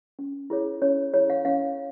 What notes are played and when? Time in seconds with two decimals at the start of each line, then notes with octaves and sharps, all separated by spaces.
0.19 C#4
0.50 E4 G#4 C#5
0.82 C#4 C#5
1.14 E4 G#4 C#5
1.30 F5
1.45 C#4 F5